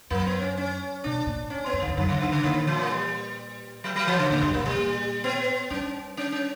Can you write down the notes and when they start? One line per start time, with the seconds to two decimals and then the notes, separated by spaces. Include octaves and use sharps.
0.10 F#2 A#3
0.26 B3
0.42 C#4
0.57 C#4
1.04 B2 D4
1.27 A#2
1.50 C#4
1.66 B3
1.73 G2
1.82 D3
1.87 E2
1.97 F#2 D3
2.09 F#2 C#3
2.21 D3
2.28 G2 C#3
2.43 A#2 D3
2.67 E3
2.81 A#3
2.90 G3
3.84 F#3
3.96 F#3
4.07 E3
4.19 C#3
4.30 A#2 C#3
4.42 G2 G3
4.54 A#2 A#3
4.65 B2 G3
4.77 A#2
5.24 B3
5.70 G3 C#4
6.17 C#4
6.32 C#4